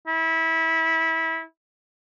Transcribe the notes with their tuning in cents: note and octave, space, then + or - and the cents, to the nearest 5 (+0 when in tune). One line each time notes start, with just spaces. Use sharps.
E4 -25